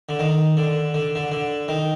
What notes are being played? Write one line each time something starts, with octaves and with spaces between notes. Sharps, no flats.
D3
D#3
D3
D3
D3
D3
D#3